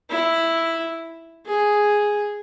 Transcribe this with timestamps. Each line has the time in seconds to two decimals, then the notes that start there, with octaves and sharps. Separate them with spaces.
0.10 E4
1.46 G#4